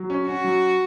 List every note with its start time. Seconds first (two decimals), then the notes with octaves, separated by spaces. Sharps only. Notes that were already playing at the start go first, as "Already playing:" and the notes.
Already playing: F#3
0.10 C#4
0.27 C#4 F#4
0.44 F#3